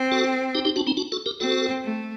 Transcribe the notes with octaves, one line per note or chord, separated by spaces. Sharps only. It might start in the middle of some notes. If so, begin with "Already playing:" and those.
Already playing: C4
F#4 A4
D#4 G4
D#4 G4
D4 F#4
C4 D#4
D4 F#4
F#4 A4
G4 A#4
C4 F#4 A4
A3